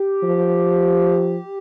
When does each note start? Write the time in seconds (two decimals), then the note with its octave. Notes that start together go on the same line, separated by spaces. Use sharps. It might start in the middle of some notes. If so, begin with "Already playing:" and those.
Already playing: G4
0.23 F3